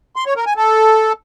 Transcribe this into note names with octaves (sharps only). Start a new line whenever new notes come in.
C6
C#5
A#4
G#5
A4